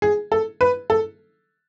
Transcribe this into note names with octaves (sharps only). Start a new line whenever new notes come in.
G#4
A4
B4
A4